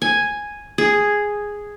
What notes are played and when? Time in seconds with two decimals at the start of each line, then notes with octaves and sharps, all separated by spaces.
0.02 G#5
0.78 G#4